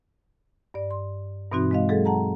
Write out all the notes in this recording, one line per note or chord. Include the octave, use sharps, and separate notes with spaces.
G2 D5
C6
G2 B2 E3 C4 D#4 F#4
G#3 D#5 F5
F#3 G#3 G#4 A4
F#5 A5 A#5